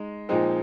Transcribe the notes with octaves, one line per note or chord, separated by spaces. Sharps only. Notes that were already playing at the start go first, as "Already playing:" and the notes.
Already playing: G#3 D#4
A#2 F3 G#3 C4 D#4